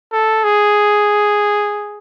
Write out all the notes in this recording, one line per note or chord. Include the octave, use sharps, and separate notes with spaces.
A4
G#4